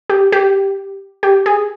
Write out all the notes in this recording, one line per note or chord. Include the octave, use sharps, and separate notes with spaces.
G4
G4
G4
G#4